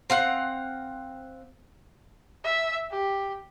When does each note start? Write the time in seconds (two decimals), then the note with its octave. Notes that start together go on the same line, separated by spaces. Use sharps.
0.10 C4 F5 F#5
2.44 E5
2.91 G4